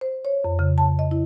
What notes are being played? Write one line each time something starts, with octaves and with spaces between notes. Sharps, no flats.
C5
C#5
F2
C#3
A5
D#5
E4